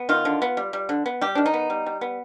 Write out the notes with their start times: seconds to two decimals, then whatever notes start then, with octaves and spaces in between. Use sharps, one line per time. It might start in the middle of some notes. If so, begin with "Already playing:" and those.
Already playing: B3
0.09 D#3 F4
0.25 D3
0.42 B3
0.57 G3
0.73 G3
0.89 D3
1.06 B3
1.21 G3 G4
1.35 D#3 D4
1.46 D#4
1.54 B3
1.70 G3
1.86 G3
2.01 B3